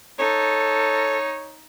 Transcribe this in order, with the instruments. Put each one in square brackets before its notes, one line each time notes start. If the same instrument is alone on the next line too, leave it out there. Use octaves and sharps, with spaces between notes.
[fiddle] D#4 [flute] A4 [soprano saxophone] C#5